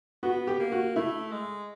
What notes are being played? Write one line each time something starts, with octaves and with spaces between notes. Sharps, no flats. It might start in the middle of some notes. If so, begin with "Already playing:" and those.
B3 F#4
G4
A#3
F#4
A3 E4
G#3